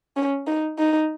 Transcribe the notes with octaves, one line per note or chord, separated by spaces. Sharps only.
C#4
D#4
D#4